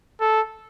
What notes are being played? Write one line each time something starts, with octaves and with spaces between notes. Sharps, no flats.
A4